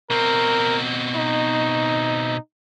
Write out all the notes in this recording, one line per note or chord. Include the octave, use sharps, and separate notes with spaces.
B2 C4 A#4
D#4